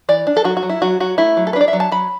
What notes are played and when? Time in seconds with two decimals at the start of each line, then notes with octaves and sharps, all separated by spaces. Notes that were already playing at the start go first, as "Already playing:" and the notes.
0.09 E3 D5
0.27 D4
0.37 A4
0.44 F#3 F#4
0.57 F#4
0.63 F#3
0.69 E4
0.82 F#3 F#4
1.00 F#3 F#4
1.18 A3 E4
1.37 F#3
1.47 A4
1.53 B4
1.56 D4 D5
1.68 E5
1.73 F#3
1.80 A5
1.92 F#3 B5